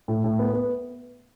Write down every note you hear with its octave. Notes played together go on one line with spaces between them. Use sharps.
A2
A2
B3
B3